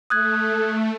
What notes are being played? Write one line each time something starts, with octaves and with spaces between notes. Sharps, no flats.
A3 D#6 F#6 G#6